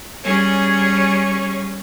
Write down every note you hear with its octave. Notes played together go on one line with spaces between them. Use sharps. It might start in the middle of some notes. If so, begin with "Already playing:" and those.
G3 C#4 G#4 C#5